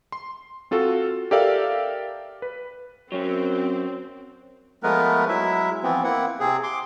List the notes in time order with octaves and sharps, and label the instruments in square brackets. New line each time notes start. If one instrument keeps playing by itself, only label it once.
[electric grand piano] C6
C4 F4 F#4 A4
G4 A4 A#4 D5 E5 F5
B4
[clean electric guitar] F#3 C#4 [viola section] C4
[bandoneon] F3 G#3 A3 B3 A#4 B4
F#3 G#3 E4 E5
E3 F3 B3 C4
A#3 C4 E4 F#5
C3 C4 G#4
C6 D6